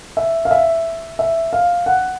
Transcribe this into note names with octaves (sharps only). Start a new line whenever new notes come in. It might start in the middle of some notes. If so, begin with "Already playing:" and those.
E5
F5
E5
E5
F5
F#5